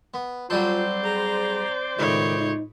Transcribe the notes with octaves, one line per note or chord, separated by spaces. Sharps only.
B3
F#3 G3 C4 F4 A4 C5 D5
G#4 A#5
C#2 A2 D#3 C#5
D#4